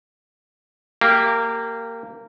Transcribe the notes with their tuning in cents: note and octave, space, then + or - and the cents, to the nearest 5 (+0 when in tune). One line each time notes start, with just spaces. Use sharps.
A#3 -20 G4 +0